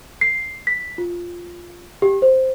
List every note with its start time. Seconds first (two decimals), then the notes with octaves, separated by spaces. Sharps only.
0.21 C7
0.67 B6
0.98 F4
2.02 G4
2.22 C5